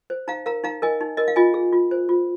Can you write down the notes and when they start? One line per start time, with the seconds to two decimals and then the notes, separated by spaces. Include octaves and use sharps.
0.10 C5
0.28 D#4 F5 A#5
0.46 A#4 F5 A#5
0.64 D#4 F5 A#5
0.82 A#4 D#5 G#5
1.01 D#4
1.17 A#4 D#5
1.28 F5
1.36 F4 D#5 G#5
1.54 G#4
1.73 F4
1.91 C5
2.09 F4